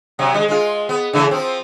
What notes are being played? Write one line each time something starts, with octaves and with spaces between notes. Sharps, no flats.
C3 F#3
G3 G#3
G#3 F4
B3
C#3 E3 A3
F3 C4